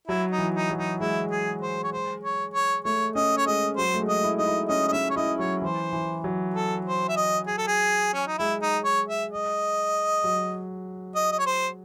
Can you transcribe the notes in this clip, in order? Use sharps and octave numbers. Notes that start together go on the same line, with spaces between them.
F#3 E4
D#4
E3
D#4
F#3
D#4
G#3 E4
G#4
C5
C#5
C5
C#5
C#5
A3 C#5
C#4 D#5
C#5
G#3 D#5
F#3 C5
A3
G#3
D#5
E4
D#4 D#5
E4
C#4 D#5
D#5
C#4 E5
C#5
E4 D#5
F#3 C#5
E3 C5
E3
F#3
A4
C5
E5
D#5
G#4
A4
G#4
C#4
D#4
G#3 E4
D#4
C#5
E5
D#5
F#3
D#5
D#5
C#5
C5